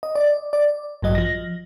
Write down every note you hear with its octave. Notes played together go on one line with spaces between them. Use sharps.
D#5
D5
D5
A1 G2 F#3 D#5
F3 A#6